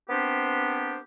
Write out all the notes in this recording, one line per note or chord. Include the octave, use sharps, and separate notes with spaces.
B3 C4 D4 G4 A#4 C5